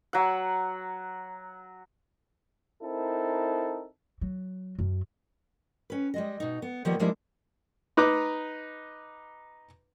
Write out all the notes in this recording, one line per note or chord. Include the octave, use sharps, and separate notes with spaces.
F#3 F#5
C4 D#4 E4 A4 A#4
F#3
F#2
C#4 B4
G3 G#3 D#5
B2 D#4
B3
D#3 F3 G3 A#3 B3
F3 G3 G#3 A#3 D4 E4
D#4 B4 A#5 D6